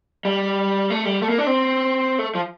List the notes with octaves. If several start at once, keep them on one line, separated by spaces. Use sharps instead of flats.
G3
A3
G3
A3
A#3
D4
C4
A3
F3